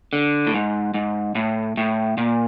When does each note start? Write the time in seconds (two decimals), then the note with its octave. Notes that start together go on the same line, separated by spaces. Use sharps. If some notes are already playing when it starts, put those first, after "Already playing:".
0.13 D3
0.47 A2
0.54 G#2
0.94 G#2
1.35 A2
1.77 A2
2.17 A#2